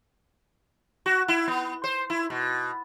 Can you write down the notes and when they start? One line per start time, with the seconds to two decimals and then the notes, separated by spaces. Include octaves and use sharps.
1.06 F#4
1.28 E4
1.48 B3
1.84 C5
2.10 E4
2.30 B2